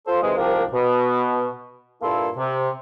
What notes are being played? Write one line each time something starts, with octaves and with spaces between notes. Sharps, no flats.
F4 A4 C5
C3 D#3 E3 G#3
C2 G#2 F3 D4 A#4 G5
B2
G2 A#2 A#3 E4 A4 C6
C3